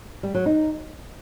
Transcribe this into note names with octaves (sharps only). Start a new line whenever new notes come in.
G3
F#3
D#4